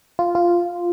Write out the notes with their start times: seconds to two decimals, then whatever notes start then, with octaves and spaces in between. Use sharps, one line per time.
0.19 F4
0.35 F4